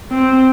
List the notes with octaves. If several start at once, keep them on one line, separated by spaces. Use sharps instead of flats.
C4